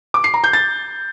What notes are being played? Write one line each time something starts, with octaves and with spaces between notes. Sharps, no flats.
D6
C7
A#5
G6
A6